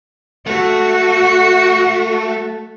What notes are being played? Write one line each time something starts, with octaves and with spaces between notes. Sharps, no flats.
A3 F#4